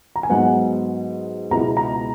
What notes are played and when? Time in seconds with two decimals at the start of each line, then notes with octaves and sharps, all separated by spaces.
0.16 A#5
0.23 G#5
0.29 G#2 F#3 B3 F#5
1.51 C#2 B2 G#3 B3 E4 A#5
1.77 A#5